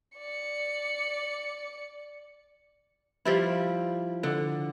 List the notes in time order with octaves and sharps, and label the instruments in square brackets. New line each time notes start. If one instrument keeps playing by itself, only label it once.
[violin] D5 C#7
[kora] F3 G3 E4
D3